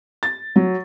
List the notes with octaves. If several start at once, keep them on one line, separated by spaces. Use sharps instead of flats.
A6
F#3